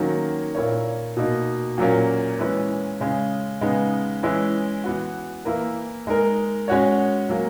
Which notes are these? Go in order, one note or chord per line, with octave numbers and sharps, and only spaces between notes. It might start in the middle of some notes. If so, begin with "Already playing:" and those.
Already playing: D#3 F#3 A#3 C#4
A#2 A#3 E4 A#4 C#5
B2 A#3 D#4
A#2 F#3 A#3 C#4
E3 G#3 C#4 E4 B4
C#3 G#3 C#4
C#3 G#3 B3 D#4
E3 G#3 C#4 E4
E3 B3 F#4
E3 A#3 E4 A#4
G#3 D#4 A#4
G#3 C#4 F#4 C#5
F#3 A#3 C#4